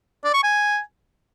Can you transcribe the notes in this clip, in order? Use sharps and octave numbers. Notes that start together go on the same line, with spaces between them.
D5
C#6
G#5